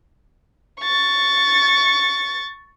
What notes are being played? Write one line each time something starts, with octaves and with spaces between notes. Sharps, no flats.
C#6 A6